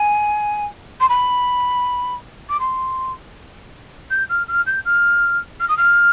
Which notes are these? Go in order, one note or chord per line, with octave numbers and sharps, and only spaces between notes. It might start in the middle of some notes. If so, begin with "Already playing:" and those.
Already playing: G#5
C6
B5
D6
C6
G6
F6
F6
G6
F6
F6
D#6
F6